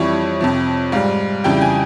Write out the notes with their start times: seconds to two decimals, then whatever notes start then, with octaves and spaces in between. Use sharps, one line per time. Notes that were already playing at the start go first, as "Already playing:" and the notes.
Already playing: F2 E3 G3 C#5
0.41 F2 C3 F3
0.92 G#2 G3 F5
1.44 F2 C#3 E3 G3 G5
1.61 G#5